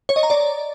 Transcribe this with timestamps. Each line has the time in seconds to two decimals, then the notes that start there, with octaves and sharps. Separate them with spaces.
0.09 C#5
0.16 D#5
0.23 A#5
0.30 D5